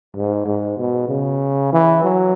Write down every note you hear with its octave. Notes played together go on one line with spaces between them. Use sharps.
G#2
G#2
B2
C#3
E3
F#3